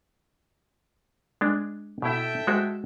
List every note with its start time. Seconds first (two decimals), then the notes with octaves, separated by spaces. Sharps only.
1.41 G#3 D4
2.02 B2 E4 A4 E5 G5
2.47 G#3 F#4 C5